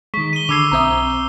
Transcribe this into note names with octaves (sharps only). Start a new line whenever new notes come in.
D#3 G#3 C#6 B6
D#7 G7
D3 B5 D6 E6 G#6 C7
B1 C4 E5 A#5 D#6